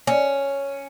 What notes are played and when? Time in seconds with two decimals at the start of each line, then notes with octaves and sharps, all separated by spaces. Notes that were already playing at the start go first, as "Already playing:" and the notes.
0.07 C#4